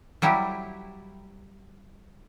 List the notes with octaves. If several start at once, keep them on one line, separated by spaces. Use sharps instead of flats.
F#3 G3 E4 G4